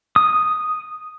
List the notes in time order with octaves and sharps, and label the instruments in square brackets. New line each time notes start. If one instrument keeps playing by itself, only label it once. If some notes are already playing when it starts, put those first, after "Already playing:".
[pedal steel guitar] D#6